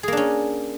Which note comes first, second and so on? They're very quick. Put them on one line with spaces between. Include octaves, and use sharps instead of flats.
G#4 A#3 D4 C#4